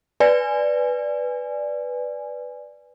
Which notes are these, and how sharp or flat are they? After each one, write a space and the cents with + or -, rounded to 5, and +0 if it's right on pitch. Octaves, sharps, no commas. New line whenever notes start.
B4 +0 D5 +0 G#5 +0